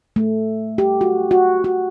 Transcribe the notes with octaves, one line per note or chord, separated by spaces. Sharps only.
A3
G4
F#4
F#4
F#4